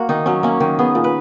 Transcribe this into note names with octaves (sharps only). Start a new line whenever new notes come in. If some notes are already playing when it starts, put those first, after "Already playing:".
Already playing: A#3 F#4
D#3 D#4
F#3 C#4
A#3 C#4
D#3 D#4
B3 G#4
A#2
B4